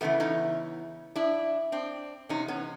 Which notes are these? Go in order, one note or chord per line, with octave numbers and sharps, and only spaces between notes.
E2 C#3 E3 A3 B3
C#4 D#4
D4 E4
C4 D4
E2 C3 C#4 D#4
B3 C#4